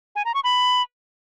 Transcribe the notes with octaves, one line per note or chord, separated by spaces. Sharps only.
G#5
A#5
C#6
B5